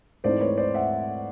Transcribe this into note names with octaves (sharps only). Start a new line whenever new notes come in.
G#2 E3 A3 C4 D#4 C5 D5
B4 C#5
C5 D5
E5 F#5